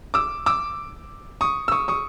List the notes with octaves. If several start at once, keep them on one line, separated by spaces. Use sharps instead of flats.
D6 E6
D6 E6
C#6 D#6
E6
C#6 D#6
C#6 D#6